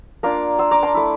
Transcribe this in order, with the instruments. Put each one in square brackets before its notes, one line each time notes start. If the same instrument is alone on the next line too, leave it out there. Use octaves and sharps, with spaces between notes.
[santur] A#3 D4 F4 A#5 D6
C6 E6
A#5 D6
A5 C6
A3 E4